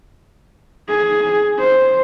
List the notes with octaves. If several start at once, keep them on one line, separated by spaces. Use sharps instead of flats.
G#4
C5